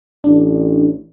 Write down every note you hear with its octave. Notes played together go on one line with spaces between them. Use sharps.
A1 D4